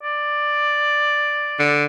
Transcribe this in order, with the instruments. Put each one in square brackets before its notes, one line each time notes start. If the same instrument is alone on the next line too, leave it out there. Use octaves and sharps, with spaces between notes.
[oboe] D5
[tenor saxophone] D3